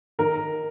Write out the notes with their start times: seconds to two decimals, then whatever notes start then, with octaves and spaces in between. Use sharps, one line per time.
0.19 D#3 A#4